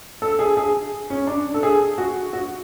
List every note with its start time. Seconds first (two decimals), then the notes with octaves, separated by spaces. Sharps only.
0.22 A4
0.39 G#4
0.57 G#4
1.10 C#4
1.27 D4
1.54 A4
1.63 G#4
1.98 F#4
2.33 F#4